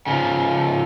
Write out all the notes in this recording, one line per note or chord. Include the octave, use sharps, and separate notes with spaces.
C#3 F3